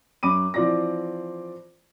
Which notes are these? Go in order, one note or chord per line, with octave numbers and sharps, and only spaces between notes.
F#2 B5 D6 D#7
E3 F3 C4 D5 D6 A#6